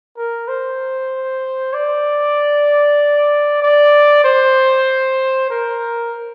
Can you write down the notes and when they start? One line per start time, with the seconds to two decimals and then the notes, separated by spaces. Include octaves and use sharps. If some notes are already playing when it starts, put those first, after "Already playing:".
0.17 A#4
0.48 C5
1.74 D5
3.62 D5
4.24 C5
5.50 A#4